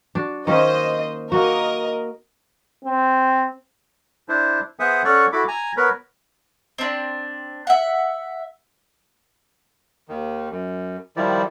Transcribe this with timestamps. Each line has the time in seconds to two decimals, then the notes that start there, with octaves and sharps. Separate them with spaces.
0.15 D4 F#4
0.47 D#3 A#3 C#4 C5 D#5
1.32 A#3 F#4 A#4 D#5
2.85 C4
4.29 D4 E4 C5
4.79 B3 G#4 C5 E5 F#5 D#6
5.04 C#4 A4 C#5 D5 F#5 C#6
5.32 E4 F#4 A4 B5 D6
5.48 G#5 A#5
5.77 B3 A#4 B4 C#5 B5
6.78 C4 D4
7.67 E5 F#5
10.09 D#2 D#3
10.51 F#2
11.17 D#3 F3 G3 E4 D5